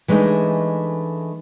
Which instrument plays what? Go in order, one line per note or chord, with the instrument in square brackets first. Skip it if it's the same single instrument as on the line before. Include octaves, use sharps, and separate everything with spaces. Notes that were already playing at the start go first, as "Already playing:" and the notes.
[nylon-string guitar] E3 G#3 A3 D4 D#4